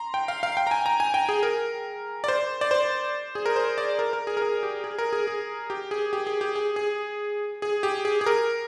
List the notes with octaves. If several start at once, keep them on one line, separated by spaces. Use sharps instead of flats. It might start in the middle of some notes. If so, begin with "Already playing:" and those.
Already playing: A#5 C6
G5
F5
F5
G5
A#5
G#5
A#5
G#5
G5
G#4
A#4
D5
C5
D5
C5
G#4
A#4
C5
D5
A#4
A#4
G#4
A#4
G#4
G4
G#4
A#4
G#4
G#4
G4
G#4
G4
G#4
G4
G#4
G#4
G#4
G4
G#4
G#4
A#4